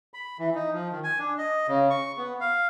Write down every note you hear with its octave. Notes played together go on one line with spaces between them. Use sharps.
B5
E3
D#4
F3
D#3
G#5
D4
D#5
C#3
C#6
B3
F5